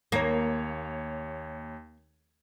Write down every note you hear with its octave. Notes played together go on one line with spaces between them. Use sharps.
D#2 A#3 C#5